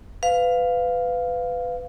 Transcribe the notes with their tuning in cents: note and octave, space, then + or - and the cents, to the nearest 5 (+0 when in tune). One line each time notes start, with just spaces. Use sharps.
B4 +25 F5 +0